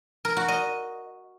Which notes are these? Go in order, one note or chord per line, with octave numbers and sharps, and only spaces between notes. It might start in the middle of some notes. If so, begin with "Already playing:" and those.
A#4
F#4
D#5